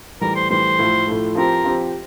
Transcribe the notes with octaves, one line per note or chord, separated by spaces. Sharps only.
A2 E3 G3 A#4
C5
A2 E3 G3 C5
A2 F3 A3
A2 F3 A3
F3 C4 G4 A#4
F3 C4 G4